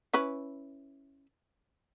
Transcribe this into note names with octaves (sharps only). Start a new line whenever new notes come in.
C#4 E4 B4